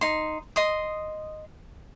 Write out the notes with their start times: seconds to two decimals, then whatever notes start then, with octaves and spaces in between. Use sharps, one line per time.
0.01 D#4 C6
0.56 D#5 C6 D#6